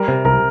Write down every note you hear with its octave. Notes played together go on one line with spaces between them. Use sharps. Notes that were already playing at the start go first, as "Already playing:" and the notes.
Already playing: G3 A#4
C3
C2 A#4